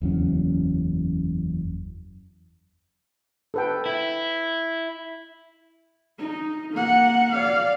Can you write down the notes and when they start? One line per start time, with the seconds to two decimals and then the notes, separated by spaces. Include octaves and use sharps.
0.02 F#1 E2 F#3 C#4
3.54 A4 B4 G5
3.86 E4
6.19 D#4
6.73 A#3 F#5
7.32 D5 F5